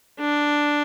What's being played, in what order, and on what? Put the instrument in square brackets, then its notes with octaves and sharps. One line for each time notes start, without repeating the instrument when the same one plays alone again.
[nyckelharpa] D4